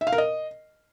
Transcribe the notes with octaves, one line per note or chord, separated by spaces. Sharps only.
E5
F5
A#4
D#5